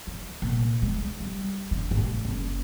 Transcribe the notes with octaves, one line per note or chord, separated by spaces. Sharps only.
E3
A#2
G#3
G3
D3
A1
F#1